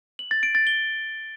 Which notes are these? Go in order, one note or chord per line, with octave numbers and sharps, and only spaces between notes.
F#7
A6
D7
A6
G7